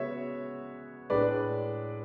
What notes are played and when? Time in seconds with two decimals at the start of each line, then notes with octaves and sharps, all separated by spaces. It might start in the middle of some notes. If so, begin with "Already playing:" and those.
Already playing: C#3 G#3 B3 F#4 C#5 E5
1.10 A2 G#3 D4 B4 D5